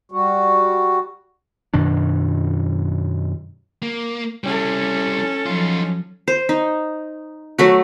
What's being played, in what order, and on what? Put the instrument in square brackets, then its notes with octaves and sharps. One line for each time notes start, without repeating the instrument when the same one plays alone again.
[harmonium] G3 F#4
[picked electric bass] F#2 B2 D#3 D4
[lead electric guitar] A#3
[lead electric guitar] G3 E4 [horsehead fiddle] C#4 A4
[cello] F3 F#3 [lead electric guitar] D#4 F4
[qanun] C5
D#4
F#3 A3 F#4